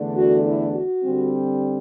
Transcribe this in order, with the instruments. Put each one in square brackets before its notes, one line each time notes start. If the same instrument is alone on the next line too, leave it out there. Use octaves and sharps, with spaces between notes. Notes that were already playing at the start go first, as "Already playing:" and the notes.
Already playing: [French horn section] E2 D3 A3 D4
F#4
E4
F#4
D3 G3 C4